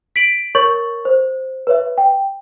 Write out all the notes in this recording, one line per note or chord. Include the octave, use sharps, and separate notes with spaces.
B6 D7 F#7
A#4 C#5 C#6 G6 A6 F#7
C5
B4 C#5 E5
G5